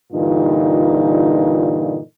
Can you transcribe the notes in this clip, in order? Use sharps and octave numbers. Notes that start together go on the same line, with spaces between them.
G2 A#2 D3 E3 D#4 F4